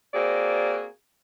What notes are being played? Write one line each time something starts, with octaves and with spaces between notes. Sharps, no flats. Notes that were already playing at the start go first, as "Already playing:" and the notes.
A#3 C4 F#4 G#4 D5